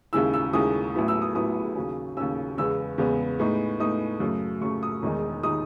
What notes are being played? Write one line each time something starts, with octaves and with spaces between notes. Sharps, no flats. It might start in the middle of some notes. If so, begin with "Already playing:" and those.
D#2 C#3 G#3 C#4 E4 E6
E6
D#2 C#3 G#3 C#4 E4 D#6
A1 A2 F#3 B3 E4
E6
D#6
A1 A2 F#3 B3 E4 D#6
D#2 C#3 F#3 C#4
D#2 C#3 F#3 C#4 E6
E2 C#3 G#3 B3 E6
E2 C#3 G#3 B3
A2 G#3 B3 D#4
A2 G#3 B3 D#4 D#6
F#2 C#3 F#3 A3
F#2 C#3 F#3 A3 C#6
D#6
E1 E2 D#3 G#3 D#4
D#3 G#3 D#4 D#6